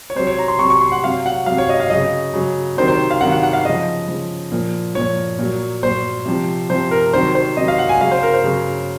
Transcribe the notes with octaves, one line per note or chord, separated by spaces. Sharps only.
C#5
C3 F#3 C5
C#5
A#5
C6
C3 F#3 C#6
C#6
C6
F#5
C3 F#3 F5
F#5
C3 F#3 F5
C#5
D#5
F5
C#3 F#3 D#5
C#3 F#3
C3 D#3 F#3 C5
C5
F5
C3 D#3 F#3 F#5
F#5
F#5
F5
C#3 F3 D#5
C#3 F3
A#2 F3
A#2 F3 C#5
A#2 F#3
A#2 F#3 C5
C3 F3
C3 F3 C5
A#4
C3 D#3 F#3 C5
C5
C3 D#3 F#3 D#5
F5
F#5
G#5
C#3 F#3 F5
C5
A#4
C5
C#3 F#3